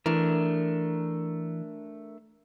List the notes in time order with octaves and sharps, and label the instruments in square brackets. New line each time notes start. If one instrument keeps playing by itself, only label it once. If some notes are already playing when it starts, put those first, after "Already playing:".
[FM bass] E3 [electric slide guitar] A3 D4 A#4